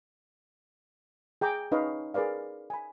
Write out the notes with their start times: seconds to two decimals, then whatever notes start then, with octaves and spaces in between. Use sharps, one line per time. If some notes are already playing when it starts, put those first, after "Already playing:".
1.41 G#4 G5 A#5 D6
1.72 C#4 D#4 B4 C#5 D#5 F5
2.14 G#4 A#4 B4 D5 F5
2.70 G#5 B5